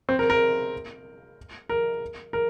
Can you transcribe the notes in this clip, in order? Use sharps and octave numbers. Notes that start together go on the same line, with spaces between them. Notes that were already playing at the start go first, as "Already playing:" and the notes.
C4
A#4
A#4
A#4
A#4